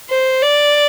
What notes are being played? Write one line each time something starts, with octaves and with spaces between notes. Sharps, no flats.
C5
D5